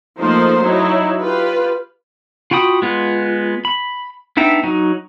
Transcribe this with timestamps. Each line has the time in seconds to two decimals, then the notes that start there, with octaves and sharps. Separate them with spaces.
0.19 F3 A3 A#3 D#4 C5
0.62 F#3 D#4 E4
1.21 F4 G4 B4
2.51 F4 F#4 G5 B5 D#6
2.82 G#3 B3 F4
3.65 B5
4.37 B3 D4 D#4 E5 G5
4.64 F#3 D#4